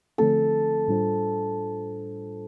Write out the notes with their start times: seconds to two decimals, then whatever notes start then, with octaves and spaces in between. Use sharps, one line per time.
0.18 D3 F3 A3 C4 E4 A4
0.88 A2 G3 D4 F4 C5